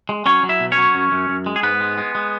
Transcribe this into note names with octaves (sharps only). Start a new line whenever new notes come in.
G#3
F#3 C#4 C#5
F#3
E4 E5
B2
C#4 C#5
F#3
F#2
F#2
F#2
G#3
G#4
G#2 B3 B4
G#3
G#3
G#3